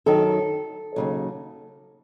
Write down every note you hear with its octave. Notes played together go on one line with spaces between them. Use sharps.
F#2 D#3 F#3 A4
D#2 C#3 F#3